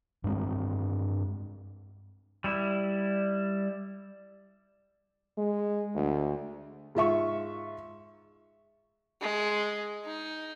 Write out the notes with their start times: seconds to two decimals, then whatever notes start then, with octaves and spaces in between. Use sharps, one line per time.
0.24 G2 G#3 B3 C4
2.44 G3 E4
5.37 G#3
5.95 D2
6.95 G#2 F4 E5 C#6
9.21 G#3
10.04 D#4